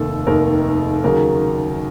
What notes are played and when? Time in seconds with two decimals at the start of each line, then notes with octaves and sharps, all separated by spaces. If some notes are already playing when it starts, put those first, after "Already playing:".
Already playing: F1 D#2 D#3 A#3 A4
0.26 F1 D#2 D#3 A#3 A#4
1.04 D#2 C#3 F#3 A#3 A#4